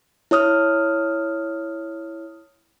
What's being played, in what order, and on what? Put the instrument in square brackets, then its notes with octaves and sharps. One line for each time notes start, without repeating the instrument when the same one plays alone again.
[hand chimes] E4 C#5 D#6 F6